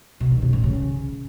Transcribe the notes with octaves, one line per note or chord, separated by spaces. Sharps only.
B2
D#3
F#2
A2
C#3